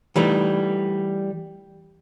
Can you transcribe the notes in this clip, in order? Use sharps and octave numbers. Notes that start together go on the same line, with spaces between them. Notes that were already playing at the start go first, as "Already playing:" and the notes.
E3 G3 A3 D#4